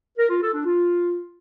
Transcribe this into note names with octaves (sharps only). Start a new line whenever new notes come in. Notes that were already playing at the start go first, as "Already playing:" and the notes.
A#4
F4
A4
D4
F4